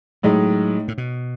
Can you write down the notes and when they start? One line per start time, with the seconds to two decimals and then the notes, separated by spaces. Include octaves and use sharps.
0.23 A2 F#3 G#3 D#4
0.88 A2
0.98 B2